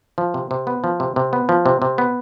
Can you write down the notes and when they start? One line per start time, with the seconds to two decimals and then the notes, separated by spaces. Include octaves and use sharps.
0.18 F3
0.34 C3
0.51 C3
0.67 B3
0.84 F3
1.00 C3
1.16 C3
1.33 B3
1.49 F3
1.66 C3
1.82 C3
1.98 B3